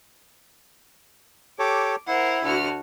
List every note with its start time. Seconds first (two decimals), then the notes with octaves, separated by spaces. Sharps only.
1.59 G4 A4 C#5 D6
2.08 E4 A#4 C5 F#5
2.43 D2 F#4 F6